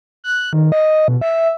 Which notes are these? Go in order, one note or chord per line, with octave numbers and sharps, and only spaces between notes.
F#6
D#3
D#5
B2
E5